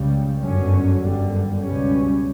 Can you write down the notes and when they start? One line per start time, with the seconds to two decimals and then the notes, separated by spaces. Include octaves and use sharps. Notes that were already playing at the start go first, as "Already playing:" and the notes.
Already playing: C#2 C#3 G3
0.41 G1 F#2 D3 F#3 C#4
1.01 G1 F#2 D3 G3
1.61 C#2 B2 G3 C#4